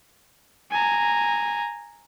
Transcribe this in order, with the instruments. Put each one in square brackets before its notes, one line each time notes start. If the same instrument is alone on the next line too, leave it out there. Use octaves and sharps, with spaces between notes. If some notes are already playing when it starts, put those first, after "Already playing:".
[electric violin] G#5 A#5